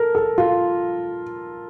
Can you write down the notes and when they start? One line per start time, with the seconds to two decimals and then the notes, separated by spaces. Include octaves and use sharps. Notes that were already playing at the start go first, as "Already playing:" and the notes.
Already playing: A4 A#4
0.15 A4
0.38 F4